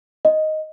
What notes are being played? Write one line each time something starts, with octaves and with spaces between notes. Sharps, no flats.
D#5